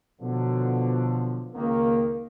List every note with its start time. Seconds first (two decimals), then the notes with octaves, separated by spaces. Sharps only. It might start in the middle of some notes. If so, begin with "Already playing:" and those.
0.20 B2 D3 F3 F#3
1.54 C#2 D#3 A#3